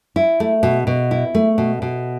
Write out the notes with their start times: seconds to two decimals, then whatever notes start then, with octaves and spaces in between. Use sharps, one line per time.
0.16 E4
0.40 A3
0.63 B2
0.87 B2
1.11 E4
1.35 A3
1.58 B2
1.82 B2